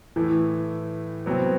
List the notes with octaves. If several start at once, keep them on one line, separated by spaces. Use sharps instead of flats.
A2 E3 A3
C3 F#3 B3